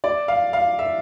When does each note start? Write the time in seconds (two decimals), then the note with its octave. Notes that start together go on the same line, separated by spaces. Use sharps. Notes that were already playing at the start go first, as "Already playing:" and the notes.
0.04 D5
0.28 F5
0.53 F5
0.79 E5